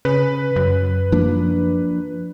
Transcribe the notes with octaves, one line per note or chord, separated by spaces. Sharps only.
C#3 B4
F#2
F3 A#3 D4